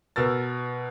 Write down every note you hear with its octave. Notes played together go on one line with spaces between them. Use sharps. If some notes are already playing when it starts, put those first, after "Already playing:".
B2 A#4 E6 A6